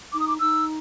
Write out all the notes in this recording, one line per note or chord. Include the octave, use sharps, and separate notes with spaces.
D#4 D6
D#6
D6
D#4 E6